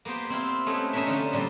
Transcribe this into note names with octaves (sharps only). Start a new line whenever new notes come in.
A#3 B3 G4 C5 G5
C4 E4 F4
A3 B3 C#4 D#4 E4
C#4 D#4 A#4 C5 E5
D3 F3
A#2 G3 C4